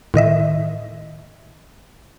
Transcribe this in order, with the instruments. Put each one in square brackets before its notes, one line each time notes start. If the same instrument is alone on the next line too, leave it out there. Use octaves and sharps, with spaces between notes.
[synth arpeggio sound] A2 D#3 D#5 E5